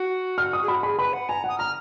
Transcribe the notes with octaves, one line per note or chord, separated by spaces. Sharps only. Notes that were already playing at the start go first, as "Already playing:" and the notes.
Already playing: F#4
F6
D#6
G#4
F#4 B5
G#4 B5
B4 B5
F#5
G#5 A#5
F#5 D#6
A#5 F6